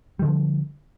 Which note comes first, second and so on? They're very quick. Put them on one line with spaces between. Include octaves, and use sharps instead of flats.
G3 D#3 D3 F3